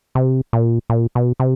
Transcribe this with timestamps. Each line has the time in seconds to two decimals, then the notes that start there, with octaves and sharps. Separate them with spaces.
0.15 C3
0.53 A#2
0.90 A#2
1.15 B2
1.40 C3